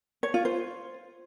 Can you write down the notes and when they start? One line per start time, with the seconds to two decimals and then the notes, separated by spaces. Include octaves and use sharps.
0.23 C#5
0.34 F4
0.45 C5